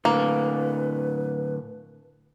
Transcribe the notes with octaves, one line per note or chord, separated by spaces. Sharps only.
A2 D3 A#3 B4